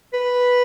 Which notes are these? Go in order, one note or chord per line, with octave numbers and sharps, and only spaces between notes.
B4